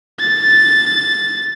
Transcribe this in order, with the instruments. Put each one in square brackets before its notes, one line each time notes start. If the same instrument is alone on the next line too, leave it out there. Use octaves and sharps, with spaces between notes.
[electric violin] A6